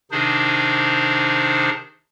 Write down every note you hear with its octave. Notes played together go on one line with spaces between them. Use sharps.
C3 D#3 D4 D#4 G#4 C5